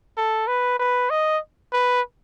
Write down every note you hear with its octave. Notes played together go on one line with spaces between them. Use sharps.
A4
B4
B4
D#5
B4